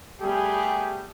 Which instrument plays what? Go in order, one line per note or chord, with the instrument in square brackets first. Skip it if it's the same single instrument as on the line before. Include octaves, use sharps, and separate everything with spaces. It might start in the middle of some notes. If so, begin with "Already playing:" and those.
[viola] G3 B3 [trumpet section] A3 G4 G#4